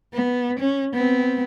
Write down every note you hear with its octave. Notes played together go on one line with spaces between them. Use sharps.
B3
C#4
B3 C4